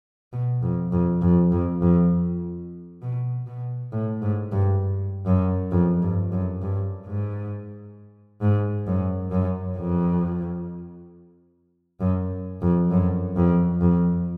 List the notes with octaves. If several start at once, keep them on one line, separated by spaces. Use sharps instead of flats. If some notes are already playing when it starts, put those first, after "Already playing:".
B2
F2
F2
F2
F2
F2
B2
B2
A2
G#2
G2
F#2
F2
G2
F#2
G2
G#2
G#2
F#2
F#2
F2
F#2
F2
F#2
F2
F2